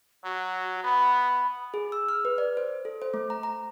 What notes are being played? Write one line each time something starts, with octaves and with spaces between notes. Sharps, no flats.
F#3 F#4
B3 B5
G#4
E6
F6
B4
D5
C5
A4
C5
A3
A#5
A#5